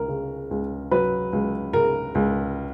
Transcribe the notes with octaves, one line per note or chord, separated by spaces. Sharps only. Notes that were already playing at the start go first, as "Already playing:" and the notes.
Already playing: C#2 A#4
C#3
C#2
F#3 B4
C#2
C#3 A#4
C#2